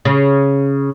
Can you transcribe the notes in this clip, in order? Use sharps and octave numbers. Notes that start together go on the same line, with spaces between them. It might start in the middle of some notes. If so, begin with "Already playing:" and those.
C#3